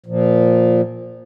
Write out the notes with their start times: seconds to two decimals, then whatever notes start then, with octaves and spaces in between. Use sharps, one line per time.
0.06 A#2 F3